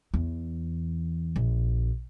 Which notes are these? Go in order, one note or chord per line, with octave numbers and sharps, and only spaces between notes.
E2
A#1